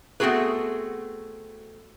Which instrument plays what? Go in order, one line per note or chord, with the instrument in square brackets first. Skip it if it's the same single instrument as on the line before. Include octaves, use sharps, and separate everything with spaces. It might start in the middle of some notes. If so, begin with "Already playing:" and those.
[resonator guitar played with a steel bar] A3 B3 C4 F#4 G#4 B4